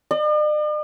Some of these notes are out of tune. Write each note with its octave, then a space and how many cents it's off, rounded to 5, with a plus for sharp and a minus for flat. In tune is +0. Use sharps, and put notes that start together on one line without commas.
D5 +45